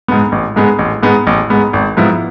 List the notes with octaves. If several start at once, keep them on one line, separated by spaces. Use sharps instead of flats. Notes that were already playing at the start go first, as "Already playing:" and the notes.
G#2 G#3 B3
A1
G#2 G#3 B3
A1
G#2 G#3 B3
A1
G#2 G#3 B3
G#1
G#2 F3 B3 E4